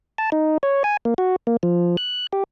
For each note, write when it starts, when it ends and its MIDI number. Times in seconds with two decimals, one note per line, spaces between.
0.18 0.30 81
0.32 0.58 63
0.63 0.83 73
0.84 0.97 80
1.05 1.14 58
1.18 1.36 66
1.47 1.57 58
1.63 1.96 53
1.97 2.27 90
2.33 2.44 67